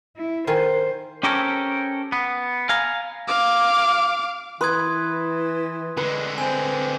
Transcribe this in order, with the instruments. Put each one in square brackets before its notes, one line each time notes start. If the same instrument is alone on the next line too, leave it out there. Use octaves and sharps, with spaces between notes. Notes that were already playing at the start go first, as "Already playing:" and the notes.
[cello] E4
[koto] D#3 F4 G#5 [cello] C5
[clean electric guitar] C#4 G4 A4 A#4 C5 C#5
B3
F5 G#5 A#5
[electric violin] F5 D6
[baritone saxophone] E3 [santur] B4 [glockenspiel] C6 D#6 G#6
[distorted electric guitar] D3 G#3 [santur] B4
[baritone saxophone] C4 [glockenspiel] G#5